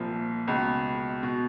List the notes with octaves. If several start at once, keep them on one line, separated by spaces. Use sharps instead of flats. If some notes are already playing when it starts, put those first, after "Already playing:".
Already playing: C2 A#2 F3
C#2 B2
B2